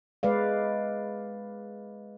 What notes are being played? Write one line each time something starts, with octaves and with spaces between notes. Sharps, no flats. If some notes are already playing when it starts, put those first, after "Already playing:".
G#3 B4 D5 F5